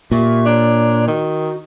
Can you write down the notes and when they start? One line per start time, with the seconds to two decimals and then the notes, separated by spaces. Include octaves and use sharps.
0.12 A#2 G4 E5 C#6
0.46 D4 C#5 A#5
1.08 D#3 D#4 F#4